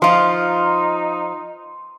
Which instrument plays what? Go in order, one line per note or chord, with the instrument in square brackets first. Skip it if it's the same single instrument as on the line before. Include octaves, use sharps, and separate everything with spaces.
[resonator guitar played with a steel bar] F3 F4 [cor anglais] D#4 [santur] C6